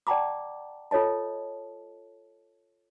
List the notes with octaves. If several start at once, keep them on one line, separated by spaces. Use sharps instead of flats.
D5 F#5 G5 A5 A#5 D6
F4 A4 C#5 D#5 A5